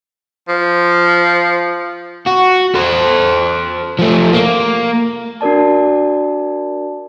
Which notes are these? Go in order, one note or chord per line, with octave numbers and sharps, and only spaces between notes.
F3
F#4
A4 C5
F3 A3
A#3
D4 F#4 A#4 D5 A5